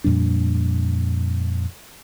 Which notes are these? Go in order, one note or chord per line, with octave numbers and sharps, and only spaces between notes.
F2 A#2 G3 D4